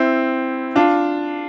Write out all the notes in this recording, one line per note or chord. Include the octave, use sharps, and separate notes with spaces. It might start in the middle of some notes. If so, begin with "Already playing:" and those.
Already playing: C4 E4
D4 F4